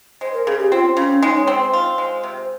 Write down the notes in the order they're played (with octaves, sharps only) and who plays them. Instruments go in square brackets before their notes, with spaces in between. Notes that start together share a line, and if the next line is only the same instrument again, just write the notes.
[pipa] G#3 [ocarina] C5
[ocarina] A#4
[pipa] C#3 [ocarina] G#4
[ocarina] G4
[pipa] C4 [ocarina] F4
[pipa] C#3 [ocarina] C#4
[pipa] G#3 [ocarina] D#4
[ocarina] C#5
[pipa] C4 [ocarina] C5
[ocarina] C5
[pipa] F4 [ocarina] C5
[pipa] G#3
C3